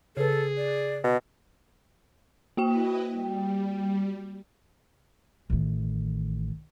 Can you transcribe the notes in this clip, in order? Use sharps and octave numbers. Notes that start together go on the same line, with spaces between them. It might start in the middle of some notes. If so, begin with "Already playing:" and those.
C#3 G#4 A4 B4
D5
B2
A#3 E4 F#4 B4 D#5 G5
G3
A1 D#3